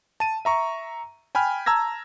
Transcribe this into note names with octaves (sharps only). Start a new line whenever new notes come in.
A5 D#7
E5 A#5 C#6
G5 G#5 B5 F6
A5 A#5 E6 G#6 A#6